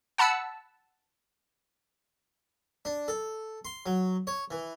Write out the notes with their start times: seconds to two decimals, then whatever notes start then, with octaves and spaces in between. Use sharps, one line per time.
0.18 F#5 A5 B5 E6 C#7
2.85 D4
3.08 A4
3.65 C6
3.86 F#3
4.27 C#5
4.51 E3